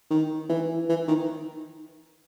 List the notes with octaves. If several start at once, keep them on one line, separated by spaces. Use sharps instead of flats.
D#3
E3
E3
D#3